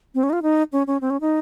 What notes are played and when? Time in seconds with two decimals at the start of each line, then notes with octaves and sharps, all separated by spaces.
0.14 C4
0.23 C#4
0.30 D#4
0.33 F4
0.42 D#4
0.73 C#4
0.87 C#4
1.01 C4
1.10 C#4
1.21 D#4